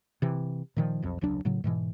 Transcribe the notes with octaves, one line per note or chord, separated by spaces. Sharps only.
C3 E3
A#2 D#3 F3
B1 F2
E1 C#2 F#3 D4
A2 C#3 F#3
G#2 B2 E3